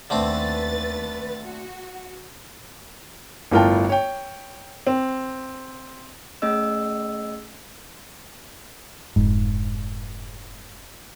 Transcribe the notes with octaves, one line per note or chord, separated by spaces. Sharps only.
D#2 D3 A3 C4 B4 A6
F#4
G1 A2 F4 A#4 G5 A5
C#5 G5
C4
A3 C#4 G#4 D#5 E6
F1 G#2